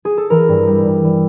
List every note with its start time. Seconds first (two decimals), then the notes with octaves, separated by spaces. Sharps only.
0.05 G#4
0.17 A4
0.30 E3 A#4
0.49 G2
0.67 G3
0.85 G2
1.04 E3